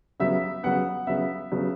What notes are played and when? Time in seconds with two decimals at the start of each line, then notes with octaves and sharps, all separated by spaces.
0.20 C#3 F#3 B3 E5
0.63 C#3 F#3 B3 F#5
1.07 C#3 F#3 B3 E5
1.52 C#3 F#3 B3